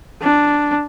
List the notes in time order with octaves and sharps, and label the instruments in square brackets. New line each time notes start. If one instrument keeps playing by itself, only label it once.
[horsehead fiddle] D4